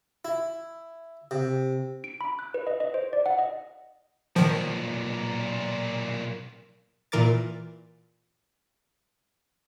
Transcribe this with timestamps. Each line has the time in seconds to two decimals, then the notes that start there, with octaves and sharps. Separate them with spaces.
0.25 E4
1.31 C3
2.04 D7
2.21 B5
2.39 F#6
2.54 B4
2.67 D#5
2.80 D#5
2.94 C5
3.13 D5
3.26 F#5
3.38 D#5
4.36 B1 A#2 D#3 F3
7.12 A#2 E3 A#4 D6 A6